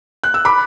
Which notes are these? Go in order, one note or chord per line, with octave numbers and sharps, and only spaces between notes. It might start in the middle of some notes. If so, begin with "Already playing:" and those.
F#6
E6
B5 D6